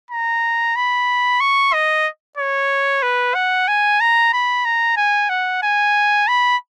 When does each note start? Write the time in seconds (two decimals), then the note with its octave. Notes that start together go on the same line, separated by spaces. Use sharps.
0.11 A#5
0.76 B5
1.40 C#6
1.74 D#5
2.37 C#5
3.03 B4
3.35 F#5
3.68 G#5
4.01 A#5
4.33 B5
4.65 A#5
4.97 G#5
5.29 F#5
5.63 G#5
6.28 B5